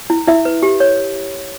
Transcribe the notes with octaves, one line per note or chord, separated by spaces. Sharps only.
E4
E4 E5
B4
G4
C#5